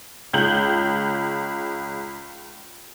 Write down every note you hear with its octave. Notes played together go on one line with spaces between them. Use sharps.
C#2 G6 F#7